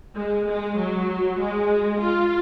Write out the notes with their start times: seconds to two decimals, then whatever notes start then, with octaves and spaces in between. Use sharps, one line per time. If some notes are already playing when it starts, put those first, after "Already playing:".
0.15 G#3
0.47 G#3
0.76 F#3
1.39 G#3
2.00 F4